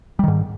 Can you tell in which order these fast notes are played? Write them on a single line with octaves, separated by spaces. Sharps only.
G3 D#3 G#2